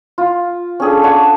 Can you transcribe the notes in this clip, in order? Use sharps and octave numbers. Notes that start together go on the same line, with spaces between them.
F4
C#4 D4 G#4 A4
D4 C#5 F#5 A5